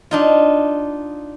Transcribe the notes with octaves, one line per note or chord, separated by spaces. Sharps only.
D4 D#4 F4